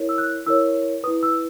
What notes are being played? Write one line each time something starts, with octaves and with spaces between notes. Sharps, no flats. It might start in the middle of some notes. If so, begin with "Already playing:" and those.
Already playing: E4 A#4 C#5
E6
F#6
E4 A#4 C#5 E6
E4 B4 D#6
E6